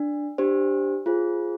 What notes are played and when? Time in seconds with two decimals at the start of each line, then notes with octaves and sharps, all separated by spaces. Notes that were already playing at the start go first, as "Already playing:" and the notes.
Already playing: D4
0.38 D4 G4 C5
1.06 F4 G#4 C5